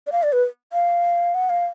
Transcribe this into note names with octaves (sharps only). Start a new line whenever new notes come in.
D5
F5
D5
B4
F5
F#5
F5